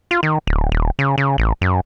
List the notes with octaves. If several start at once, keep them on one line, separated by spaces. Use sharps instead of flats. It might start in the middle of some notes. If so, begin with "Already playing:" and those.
F4
D#3
D1
D#1
C#3
C#3
A1
F#2